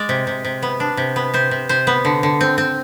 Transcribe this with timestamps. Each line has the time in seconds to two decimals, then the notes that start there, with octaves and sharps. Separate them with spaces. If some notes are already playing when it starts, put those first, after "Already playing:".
Already playing: G#3 D5
0.09 C3
0.27 C3
0.45 C3
0.62 B3
0.80 D4
0.97 C3
1.16 B3
1.34 C3 C5
1.51 C3
1.69 C3 C5
1.87 B3
2.05 D3
2.23 D3
2.41 C4
2.58 C4